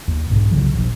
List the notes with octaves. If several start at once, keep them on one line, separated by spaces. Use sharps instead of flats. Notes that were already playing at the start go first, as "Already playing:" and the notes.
D#2
B1 G#2
C2 C#3 E3 F#3
D#1 A#1